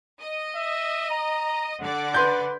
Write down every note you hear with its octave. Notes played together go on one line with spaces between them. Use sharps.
D#5
E5
A#5
D3 D5 F#5
B4 C6 G6